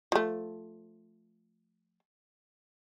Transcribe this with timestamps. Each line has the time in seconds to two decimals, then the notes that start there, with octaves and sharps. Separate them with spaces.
0.12 F3 A3